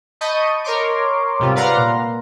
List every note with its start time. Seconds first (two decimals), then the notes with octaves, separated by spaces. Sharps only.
0.21 D#5 A5 B5 C#6 G6 D#7
0.64 A#4 C#5 C6 D6
1.39 G#2 C3 G3 F4
1.55 B4 D5 F5 F#5 A#5 C6
1.76 A#2